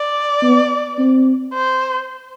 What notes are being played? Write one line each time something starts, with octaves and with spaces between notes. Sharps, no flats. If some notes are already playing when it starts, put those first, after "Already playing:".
Already playing: D5
B3
C4
C5